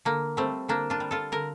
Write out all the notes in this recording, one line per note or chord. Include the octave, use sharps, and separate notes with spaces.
D3 A#3
G3 A3 C4
D3 A#3 D4
D4 F4
G3
F4 A4
D3 A#4